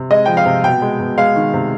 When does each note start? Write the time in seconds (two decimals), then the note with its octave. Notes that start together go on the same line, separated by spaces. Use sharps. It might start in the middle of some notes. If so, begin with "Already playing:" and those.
Already playing: C3
0.10 G#3 D#5
0.26 F3 G5
0.37 F5
0.46 C3
0.64 B2 G5
0.82 G#3
1.00 B2
1.18 G#3 F5
1.36 D#3
1.54 C3